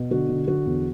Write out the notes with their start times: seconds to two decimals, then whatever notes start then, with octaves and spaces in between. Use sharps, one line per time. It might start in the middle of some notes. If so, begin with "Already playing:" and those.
Already playing: B2
0.11 D3 F#4
0.29 D3
0.47 D3 F#4
0.66 E2